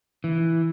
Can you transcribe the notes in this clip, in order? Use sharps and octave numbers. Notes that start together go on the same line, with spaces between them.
E3